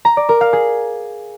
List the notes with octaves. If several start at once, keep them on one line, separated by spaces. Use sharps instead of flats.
A#5
D5
A#4
F5
G#4